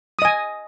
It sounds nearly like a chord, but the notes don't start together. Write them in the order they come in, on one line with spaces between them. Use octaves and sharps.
D#6 D#5 G#5